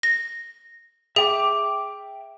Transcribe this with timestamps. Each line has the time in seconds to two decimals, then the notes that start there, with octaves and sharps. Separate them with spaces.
0.03 A#6
1.16 G#4 E5 G5 D6